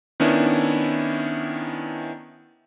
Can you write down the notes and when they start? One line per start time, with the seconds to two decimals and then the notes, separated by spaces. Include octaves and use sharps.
0.20 D#3 B3 C#4 D4 E4